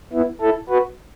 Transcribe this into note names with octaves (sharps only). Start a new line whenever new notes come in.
B3 E4
E4 A4
F#4 B4